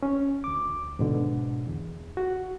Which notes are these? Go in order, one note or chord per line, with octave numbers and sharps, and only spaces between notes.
C#4
D2 D6
G#2 B2 D3
E2
F#4